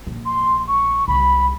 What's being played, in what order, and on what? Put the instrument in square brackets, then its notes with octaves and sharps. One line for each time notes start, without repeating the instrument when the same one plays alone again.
[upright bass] A#1
[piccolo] C6
C#6
[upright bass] C2 [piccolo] B5